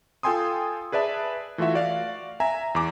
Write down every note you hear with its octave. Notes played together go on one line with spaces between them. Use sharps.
F4 A4 G5 G#5 C6 D#6
G#4 B4 D5 E5 A5
E3 A3 F4 F#4 E5
F#4 D5 F5
E5 G#5 A#5
E2 D6